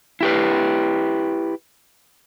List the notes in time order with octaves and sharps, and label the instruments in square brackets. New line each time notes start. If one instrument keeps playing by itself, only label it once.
[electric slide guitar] E4 G4 B4